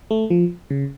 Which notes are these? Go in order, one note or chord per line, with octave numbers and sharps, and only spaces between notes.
A3
F3
C#3